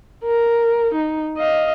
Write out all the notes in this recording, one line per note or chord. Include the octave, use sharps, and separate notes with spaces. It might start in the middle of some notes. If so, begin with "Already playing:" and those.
A#4
D#4
D#5 F5